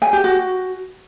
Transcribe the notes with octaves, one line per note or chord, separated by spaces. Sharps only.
G#5
G4
F#4